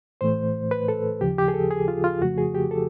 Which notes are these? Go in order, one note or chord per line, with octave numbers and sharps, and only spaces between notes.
A2 E3 A3 C5
B4
A4
D#2 C#3 F3 G4
G4
G#4
A4
G#4
F4
F4
F2 C#3 F3 A3 F#4
G#4
G4
A4